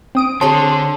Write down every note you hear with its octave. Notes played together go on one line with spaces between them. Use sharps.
C4 D#6 D7
D3 G#4 C5 C#5 A5 C6